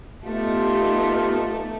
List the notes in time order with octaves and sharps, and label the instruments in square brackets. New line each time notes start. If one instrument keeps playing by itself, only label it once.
[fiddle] A3 [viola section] B3 D#4 G4 [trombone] F4